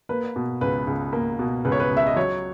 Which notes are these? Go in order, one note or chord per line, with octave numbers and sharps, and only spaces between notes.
A#3 B4
B2
C#2 B4
C#2
A#3
B2
C#2 B4
C#5
B4
C#2
E5
D#5
F#3 C#5